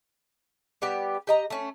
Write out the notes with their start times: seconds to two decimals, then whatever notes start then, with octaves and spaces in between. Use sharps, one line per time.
0.82 G3 B3 G4
1.27 G4 D#5 A#5
1.50 A3 C#4